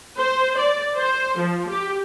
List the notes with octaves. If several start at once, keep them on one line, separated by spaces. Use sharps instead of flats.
C5
D5
C5
F3
G4